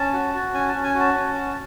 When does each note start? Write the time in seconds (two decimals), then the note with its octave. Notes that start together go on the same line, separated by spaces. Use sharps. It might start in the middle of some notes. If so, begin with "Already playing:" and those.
Already playing: C#4 A5
0.13 F#4
0.34 F#4
0.54 C#4 G#5
0.69 A5
0.74 C#4
0.84 G#5
0.95 F#4 A5
1.14 C#4
1.34 F#4